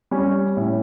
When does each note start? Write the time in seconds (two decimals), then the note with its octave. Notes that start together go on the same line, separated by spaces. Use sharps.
0.11 G3 C#4
0.57 A2